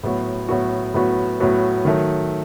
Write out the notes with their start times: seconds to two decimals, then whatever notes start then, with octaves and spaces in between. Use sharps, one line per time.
0.03 A2 F#3 B3 F#4
0.49 A2 F#3 B3 F#4
0.94 A2 F#3 B3 F#4
1.40 A2 F#3 B3 F#4
1.85 D#3 F#3 A3